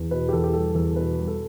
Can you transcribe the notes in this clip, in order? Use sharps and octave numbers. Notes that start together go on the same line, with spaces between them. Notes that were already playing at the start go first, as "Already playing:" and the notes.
Already playing: E2
B2 B4
G4
E2 A4
G4
G3 A4
E2 A4
B2 B4
G3
A4